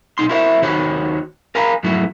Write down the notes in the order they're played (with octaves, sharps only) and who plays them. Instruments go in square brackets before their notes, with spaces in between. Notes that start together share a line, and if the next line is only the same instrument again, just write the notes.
[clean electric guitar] B1 D#4 C6
E4 F#4 A#4 C5 D5 E5
D#2 D#3 F#4 C5 C#5 B5
A#4 F5 G#5 A#5 B5
F2 G#2 F#3 A3 E4 F#4